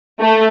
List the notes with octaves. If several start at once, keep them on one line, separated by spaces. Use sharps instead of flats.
A3